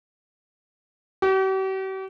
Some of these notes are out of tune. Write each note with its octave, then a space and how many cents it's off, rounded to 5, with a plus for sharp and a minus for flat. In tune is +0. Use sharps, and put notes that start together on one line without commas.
G4 -45